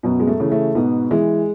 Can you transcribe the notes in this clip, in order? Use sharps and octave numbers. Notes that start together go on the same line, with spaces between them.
F#2 B2 B3
G#3
A3
C#3 E3
A3
G#2 B2 B3
E3 G#3